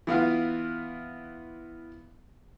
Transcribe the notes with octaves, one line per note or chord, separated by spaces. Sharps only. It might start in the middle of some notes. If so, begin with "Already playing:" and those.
E3 B3 F4 F5